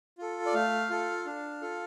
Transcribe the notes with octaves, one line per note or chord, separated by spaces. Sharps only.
F4 A4
D5
A3 F5
F4 A4
D4
F4 A4